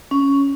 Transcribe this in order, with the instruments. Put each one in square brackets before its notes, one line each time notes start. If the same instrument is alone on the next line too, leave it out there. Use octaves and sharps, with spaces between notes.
[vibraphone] C#4